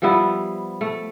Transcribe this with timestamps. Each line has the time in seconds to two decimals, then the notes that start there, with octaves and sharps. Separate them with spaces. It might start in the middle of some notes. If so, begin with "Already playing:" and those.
0.02 F3 G3 B3 E4
0.81 A3